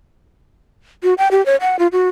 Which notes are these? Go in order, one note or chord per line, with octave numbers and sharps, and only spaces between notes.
F#4
G5
G4
C#5
F#5
F4
F#4